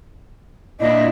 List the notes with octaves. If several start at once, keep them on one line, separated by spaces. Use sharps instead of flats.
A#2 D4 E4 D#5